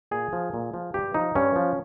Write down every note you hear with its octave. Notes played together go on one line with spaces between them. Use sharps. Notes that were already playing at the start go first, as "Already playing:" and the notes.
A#2 G#4
F3
A#2
F3
G2 G4
F3 D#4
G2 C#4
F3